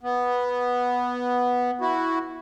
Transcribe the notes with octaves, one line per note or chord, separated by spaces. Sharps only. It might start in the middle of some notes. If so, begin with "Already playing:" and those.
B3
E4 F#4